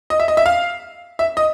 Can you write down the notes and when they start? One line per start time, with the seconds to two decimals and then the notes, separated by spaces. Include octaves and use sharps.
0.10 D#5
0.20 E5
0.28 D#5
0.37 E5
0.46 F5
1.19 E5
1.37 D#5